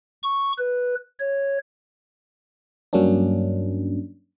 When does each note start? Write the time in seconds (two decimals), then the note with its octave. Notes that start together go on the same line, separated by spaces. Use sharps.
0.23 C#6
0.59 B4
1.20 C#5
2.93 G2 F#3 A#3 C#4 D4